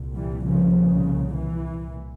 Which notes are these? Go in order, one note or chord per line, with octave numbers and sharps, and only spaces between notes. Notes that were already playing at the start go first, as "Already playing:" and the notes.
Already playing: C2 A#2
E3 G3
C#3 F3
C#3
E3